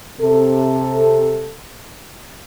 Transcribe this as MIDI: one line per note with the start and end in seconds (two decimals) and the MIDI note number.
0.20 1.55 48
0.20 1.55 69